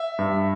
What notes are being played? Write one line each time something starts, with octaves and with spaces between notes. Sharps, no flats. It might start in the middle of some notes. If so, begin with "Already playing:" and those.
Already playing: E5
G2